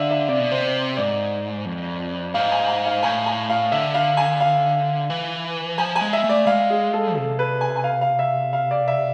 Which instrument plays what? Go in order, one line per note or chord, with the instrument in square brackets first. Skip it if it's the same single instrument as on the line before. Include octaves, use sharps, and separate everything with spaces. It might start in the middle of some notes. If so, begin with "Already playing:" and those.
Already playing: [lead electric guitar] D3 [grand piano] D5 E5 F5
[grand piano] E5
[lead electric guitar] C3 [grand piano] D5
[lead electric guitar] B2
[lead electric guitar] C3 [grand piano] C5
[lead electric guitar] G#2 [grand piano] D5
[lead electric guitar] F2
[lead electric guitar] G#2 [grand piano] F5
[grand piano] G#5
G#5
F5
[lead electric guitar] A2 [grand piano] G#5
[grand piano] G#5
F5
[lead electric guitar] D3 [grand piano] E5
[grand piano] F5
G#5
F5
[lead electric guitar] E3
[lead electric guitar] F3 [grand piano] G#5
[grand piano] G#5
[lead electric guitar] G#3
[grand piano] E5
[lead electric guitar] A3
[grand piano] D5
[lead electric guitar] G#3 [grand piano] F5
[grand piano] G#4
A4
[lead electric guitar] C3 [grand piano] A4
[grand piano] B4
G#5
G#5
F5
F5
E5
F5
D5
E5